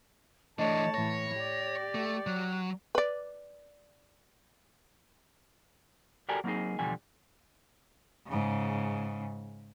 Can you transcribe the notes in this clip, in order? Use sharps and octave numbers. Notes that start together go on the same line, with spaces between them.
E3 A3 D4 C#5 D#5 A5
A2 E3 C#5 A#6
G4 D5
A3
F#3 F#6
B4 D5
F#4 G4 A4 A#4 D5 G#5
F#3 A#3 C4 D4 D#4 G#4
E2 B2 D3 F3 G3 G#5
G#2 C#3